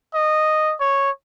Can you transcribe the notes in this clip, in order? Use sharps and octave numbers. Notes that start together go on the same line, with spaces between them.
D#5
C#5